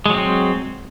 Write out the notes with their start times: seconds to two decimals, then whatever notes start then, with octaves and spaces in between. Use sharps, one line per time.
0.06 G#3
0.10 F#3
0.14 C4